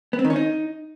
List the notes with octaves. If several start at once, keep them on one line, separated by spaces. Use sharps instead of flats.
B3
C4
D#3
C#4
D#4